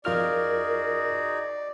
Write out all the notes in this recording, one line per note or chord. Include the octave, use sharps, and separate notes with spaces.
F2 D#4 F4 F#4 G#4 A#4 D5 F6